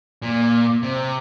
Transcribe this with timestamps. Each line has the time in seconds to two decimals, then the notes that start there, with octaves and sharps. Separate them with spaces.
0.22 A#2
0.83 C3